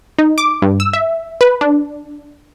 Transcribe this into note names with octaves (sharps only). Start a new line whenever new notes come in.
D#4
D6
G2
E6
E5
B4
D4